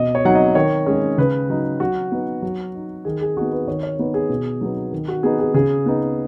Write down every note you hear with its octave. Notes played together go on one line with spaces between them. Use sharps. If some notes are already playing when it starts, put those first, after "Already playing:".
Already playing: B2 D#5
C#5
F#3 D#4 F#5
D#5
D#3 C#5
G#3 C#4 G#4
C#3 B4
F#3 D#4
F#3 F#4
B3 D#4
F#3
D#4
D#3 G#4
G#4
B3 D#4 F#4
B4
D#3 C#5
C#5
B3 D#4
G#4
B2
F#3 B3 D#4
D#3
F#4
B3 D#4 G#4
G#4
C#3 G#4
B3 D#4